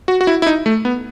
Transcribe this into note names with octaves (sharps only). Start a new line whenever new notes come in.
F#4
F#4
E4
E4
D#4
A3
B3